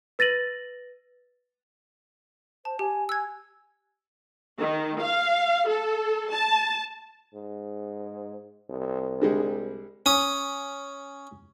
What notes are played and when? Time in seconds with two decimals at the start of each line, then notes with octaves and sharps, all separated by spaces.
0.19 B4 A6 A#6 D#7 F#7
2.65 C5 A5
2.79 G4 G#5
3.09 G#5 E6 F#6 G#6
4.59 D#3
5.01 F5
5.69 A4
6.31 A5
7.34 G#2
8.70 C2
9.22 D3 G3 G#3
10.06 C#4 D#6